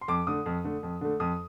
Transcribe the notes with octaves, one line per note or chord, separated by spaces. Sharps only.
C6
F2 D6
D3 A3 D#6
F2
D3 A3
F2
D3 A3
F2 D#6